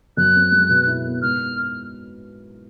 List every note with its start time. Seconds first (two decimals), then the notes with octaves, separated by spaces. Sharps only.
0.17 F#2 F#6
0.36 C4
0.52 G#3
0.69 B2
0.87 E4
1.05 B3
1.22 G#2 F6